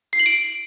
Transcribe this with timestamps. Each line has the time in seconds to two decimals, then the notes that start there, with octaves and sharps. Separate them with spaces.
0.13 C7
0.19 F#7
0.26 D7